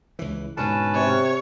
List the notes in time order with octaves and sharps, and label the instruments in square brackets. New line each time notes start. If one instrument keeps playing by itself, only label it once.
[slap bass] C#2 E3
[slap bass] G#2 B2 D3 [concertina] C#4 B4 A5
[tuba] C3 [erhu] C#5